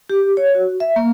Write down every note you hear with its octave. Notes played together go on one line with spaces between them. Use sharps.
G4
C#5
F#4
E5
A#3